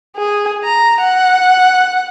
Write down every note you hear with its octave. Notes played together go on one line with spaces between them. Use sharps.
G#4
A#5
F#5